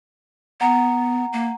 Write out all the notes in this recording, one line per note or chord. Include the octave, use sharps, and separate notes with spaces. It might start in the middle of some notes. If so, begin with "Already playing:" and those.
B3 F#5 A#5
A#3